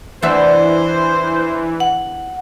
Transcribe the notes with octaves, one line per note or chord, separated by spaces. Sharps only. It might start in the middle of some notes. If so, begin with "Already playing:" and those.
E2 E3 D4 C5 E5
F#5